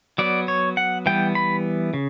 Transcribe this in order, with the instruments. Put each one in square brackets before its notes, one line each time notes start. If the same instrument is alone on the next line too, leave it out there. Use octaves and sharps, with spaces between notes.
[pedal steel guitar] F#3 B3 D5
C#5
F#5
E3 G3 B3 G5
B5
C#3